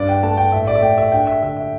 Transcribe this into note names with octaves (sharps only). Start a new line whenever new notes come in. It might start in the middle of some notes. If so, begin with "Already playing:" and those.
Already playing: G2 D4 D5
G5
A3 A5
G5
A2 E5
D5
E5
A3 G5
E5
D4 G5
E5
D3 E5
E5